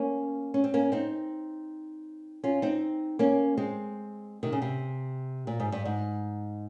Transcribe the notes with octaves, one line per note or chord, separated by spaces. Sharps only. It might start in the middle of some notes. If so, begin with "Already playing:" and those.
Already playing: A#3 C#4
C#4
C4
A#3 C#4
C4 D#4
C#4 F4
C4 D#4
A#3 C#4
G#3 C4
C3 D#3
C#3
C3
A#2
G#2
G2
G#2